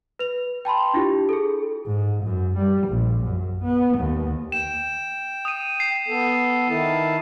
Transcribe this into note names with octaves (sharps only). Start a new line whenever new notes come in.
B4 F7
G5 A5 B5 C6
D4 E4 F4 G4
G#4 A4
G#2
F#2
G3
A#1
F#2
B3
D#2
G5 E7
D#6 D#7
C7
B3 A4
D#3 E4 A5